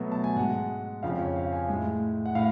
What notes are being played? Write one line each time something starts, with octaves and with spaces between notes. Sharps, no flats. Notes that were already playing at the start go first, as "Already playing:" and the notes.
Already playing: B2 F#3 A3
A5
G#5
G#2 G#3 F#5
F2 C#3 F3 F5
C#5
F5
G#5
A2 G#3
F#5
A2 F5